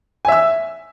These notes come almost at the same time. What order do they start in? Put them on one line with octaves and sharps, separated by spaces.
G#5 E5 E6